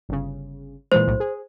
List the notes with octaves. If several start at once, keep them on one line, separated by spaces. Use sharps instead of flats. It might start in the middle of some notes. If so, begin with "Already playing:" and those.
G1 C#3
A#2 E3 G#3 C5
B1 A2
G#4